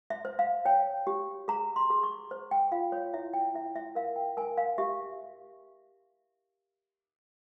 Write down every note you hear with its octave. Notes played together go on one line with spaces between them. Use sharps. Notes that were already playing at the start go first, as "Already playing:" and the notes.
E5
C5
F5
C#5 G5
G4
G#4 A#5
C6
G#4
C#6
C5
G5
F4 F5
C#5
E4 E5
G5
E4 E5
E5
A#4 F5
G5
A#4 G#5
F5
G4 E5